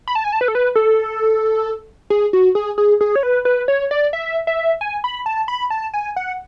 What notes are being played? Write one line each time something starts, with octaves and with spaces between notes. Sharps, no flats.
B5
A5
G#5
A5
B4
A4
B4
A4
G#4
F#4
G#4
G#4
G#4
C#5
B4
B4
C#5
D5
E5
E5
G#5
B5
A5
B5
A5
G#5
F#5